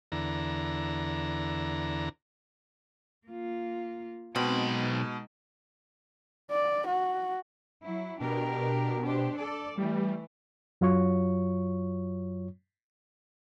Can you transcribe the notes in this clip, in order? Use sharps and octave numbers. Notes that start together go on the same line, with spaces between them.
E2 D3 A#5
A#3 F4
B1 B2 G#3 C4 D#4 F#5 B5
D5
F#4
F#3 E4
B2 D4 G4 A#4
D4 G4 C5
A4 D5
E3 G3 A3
F#2 F#3 F4 C#5 C#6